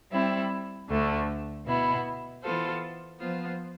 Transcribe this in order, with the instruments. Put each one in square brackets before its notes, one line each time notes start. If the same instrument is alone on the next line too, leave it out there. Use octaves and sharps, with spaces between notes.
[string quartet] G3 C4 E4
D2 D3 A3
B2 B3 E4
E3 B3 F4 A4 C5
F3 B3 F4 C5